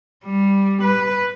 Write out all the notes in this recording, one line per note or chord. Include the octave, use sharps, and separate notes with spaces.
G3
B4